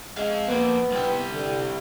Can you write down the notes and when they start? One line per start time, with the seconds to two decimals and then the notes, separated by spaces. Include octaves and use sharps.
0.17 G#3 C4 F5
0.48 F2 A#3 B3
0.92 C2 G4
1.31 D3